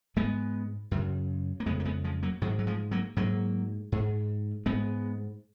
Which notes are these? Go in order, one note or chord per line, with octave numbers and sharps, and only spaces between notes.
G#2 G#3 B3
F#2 C#3
A#3
F2 C#3 G#3 B3
A#3
G#3 B3
F3 G#3
F#3 A#3
G#2 D#3 F#3
F#3
F3 G#3
F#3 A#3
G#2 F#3 A#3
G#2
G#2 G#3 B3